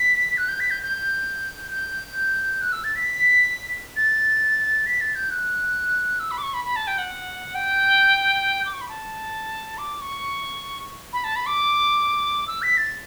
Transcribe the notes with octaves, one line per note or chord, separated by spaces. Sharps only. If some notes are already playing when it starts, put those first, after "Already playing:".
Already playing: B6
F#6
G6
B6
G6
G6
G6
F#6
E6
A6
B6
A6
B6
A6
G6
F#6
E6
B5
D6
C#6
B5
B5
A5
G5
F#5
G5
D6
C#6
B5
A5
D6
C#6
B5
A5
B5
D6
E6
B6
A6